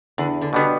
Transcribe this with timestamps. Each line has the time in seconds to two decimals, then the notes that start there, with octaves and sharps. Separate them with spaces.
0.18 E2 D3
0.41 D3
0.53 B2 D3 G3 B3